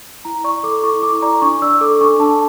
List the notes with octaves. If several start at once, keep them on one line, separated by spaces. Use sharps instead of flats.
E4 A#5
D5 C#6
A4 D6
E4 C#6
E4 D6
D5 A#5
D4 C#6
D5 E6
A4 D6
D4 C#6
D4 A5